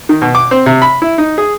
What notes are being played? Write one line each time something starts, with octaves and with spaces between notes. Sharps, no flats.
D#3
B2
D6
C4
C3
B5
E4
D#4
G#4